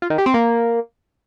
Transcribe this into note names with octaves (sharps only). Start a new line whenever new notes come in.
F4
D#3
G4
C4
A#3